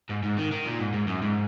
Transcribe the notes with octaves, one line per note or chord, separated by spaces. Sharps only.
G#2
G#2
D#3
D#3
A#2
G#2
G#2
F#2
G#2